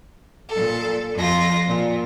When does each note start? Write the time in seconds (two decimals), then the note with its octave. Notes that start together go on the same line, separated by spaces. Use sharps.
0.49 A#2 A4
1.14 F2 F4 A#6
1.67 A#2